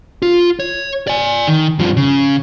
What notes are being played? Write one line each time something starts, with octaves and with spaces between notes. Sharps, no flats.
F4
C#5
D5 G#5
D#3
G2 F3
C#3